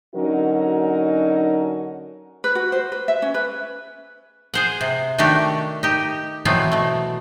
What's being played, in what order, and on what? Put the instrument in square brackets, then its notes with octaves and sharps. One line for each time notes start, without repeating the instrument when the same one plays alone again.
[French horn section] D3 F#3 C#4 D#4 F#4 A#4
[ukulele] B4
F#4
C5
B4
E5
C#4
B4
[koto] G#4 C5 F#5
C3
D#3 A3 D4 F#4 G4
D#4 G4
B2 E3 F#3 A3 B3 C4
B2 A3